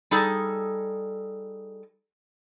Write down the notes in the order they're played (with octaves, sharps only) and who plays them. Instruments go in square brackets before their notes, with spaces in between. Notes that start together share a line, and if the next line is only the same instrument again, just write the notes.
[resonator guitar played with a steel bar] G3 D#4 G#4 A4